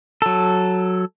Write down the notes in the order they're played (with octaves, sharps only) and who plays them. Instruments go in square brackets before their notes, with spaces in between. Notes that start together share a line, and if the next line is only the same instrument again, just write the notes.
[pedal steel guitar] F#3 A4